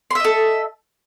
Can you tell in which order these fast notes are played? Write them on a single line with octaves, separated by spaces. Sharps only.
C6 E5 D#5 A4